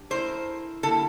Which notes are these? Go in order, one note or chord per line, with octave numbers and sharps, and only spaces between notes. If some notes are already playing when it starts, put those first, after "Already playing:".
Already playing: D4 G4
A3 E4 A#4 C5
D3 G3 A#3 E4 A4